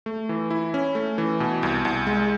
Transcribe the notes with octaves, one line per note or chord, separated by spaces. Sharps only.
A3
E3
E4
C#4
A3
E3
B2
C2
C2
G#3